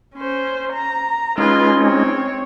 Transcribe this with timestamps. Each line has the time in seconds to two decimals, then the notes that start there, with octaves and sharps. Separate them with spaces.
0.14 C#4 C5
0.72 A#5
1.38 G#3 C#4 D#4 F4 B4
1.78 C4 C#5